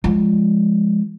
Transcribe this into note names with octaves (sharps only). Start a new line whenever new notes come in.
F3 G#3